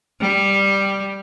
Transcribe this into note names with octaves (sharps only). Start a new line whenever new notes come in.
G3